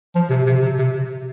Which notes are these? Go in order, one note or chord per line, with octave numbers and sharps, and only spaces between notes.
F3
C3
C3
C3
C3